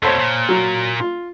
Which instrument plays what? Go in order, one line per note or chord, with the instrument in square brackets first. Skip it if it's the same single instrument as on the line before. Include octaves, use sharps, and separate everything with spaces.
[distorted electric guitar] F2 B2 [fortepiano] A4 C5 C#5
[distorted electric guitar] A#2
[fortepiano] F#3
F4